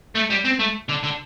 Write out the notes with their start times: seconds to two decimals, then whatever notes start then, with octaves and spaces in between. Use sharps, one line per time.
0.15 A3
0.30 G3
0.45 C4
0.59 A3
0.89 D3
1.03 D3